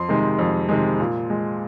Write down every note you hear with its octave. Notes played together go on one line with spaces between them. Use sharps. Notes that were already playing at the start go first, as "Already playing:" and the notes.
Already playing: F2 C6
C3 D#3 G#3
F2
C3 D#3 G#3
A#2
G#3